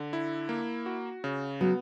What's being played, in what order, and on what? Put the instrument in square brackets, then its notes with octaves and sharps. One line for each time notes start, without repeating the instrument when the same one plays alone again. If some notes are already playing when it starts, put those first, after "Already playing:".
Already playing: [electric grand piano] D3
E4
A#3
F#4
C#3
[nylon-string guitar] F#3 [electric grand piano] B3